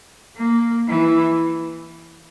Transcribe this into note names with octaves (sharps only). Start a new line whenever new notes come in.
A#3
E3